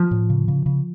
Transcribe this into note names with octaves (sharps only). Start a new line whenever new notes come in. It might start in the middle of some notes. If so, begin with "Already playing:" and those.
Already playing: F3
A2
C#3
C#3
C#3